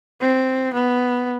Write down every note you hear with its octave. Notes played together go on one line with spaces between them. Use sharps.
C4
B3